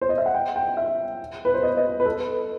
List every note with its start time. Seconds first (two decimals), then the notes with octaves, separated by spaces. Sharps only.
0.01 C5
0.09 D#5
0.18 E5
0.26 F#5
0.34 G5
0.56 G5
0.77 E5
1.45 B4
1.54 C5
1.63 D#5
1.77 D#5
2.00 B4
2.06 A4